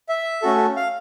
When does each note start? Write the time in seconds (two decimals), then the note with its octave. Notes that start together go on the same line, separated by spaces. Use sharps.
0.09 E5
0.42 A3 C#4 F#4 A4
0.76 F5